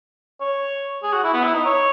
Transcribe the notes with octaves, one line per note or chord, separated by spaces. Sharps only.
C#5
G#4
F#4
E4
B3
E4
D#4
C#5